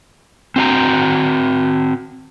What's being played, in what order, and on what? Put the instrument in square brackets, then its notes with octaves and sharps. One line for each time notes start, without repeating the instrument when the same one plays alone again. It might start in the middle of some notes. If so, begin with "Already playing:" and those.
[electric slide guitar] C4 F#4 A#5